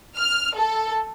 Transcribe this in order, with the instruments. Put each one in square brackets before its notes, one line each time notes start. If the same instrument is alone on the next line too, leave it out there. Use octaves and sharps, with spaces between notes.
[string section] F6
A4